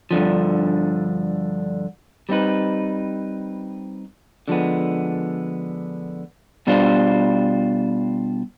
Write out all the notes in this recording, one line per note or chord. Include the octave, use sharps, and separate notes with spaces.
G2 D3 F3
G3 C4 D#4 B4
D3 F3 G#3 B3
B2 G3 D4 F4 C5